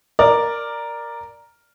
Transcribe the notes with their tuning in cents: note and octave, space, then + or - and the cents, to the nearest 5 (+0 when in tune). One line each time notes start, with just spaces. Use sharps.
A#4 +0 D5 +5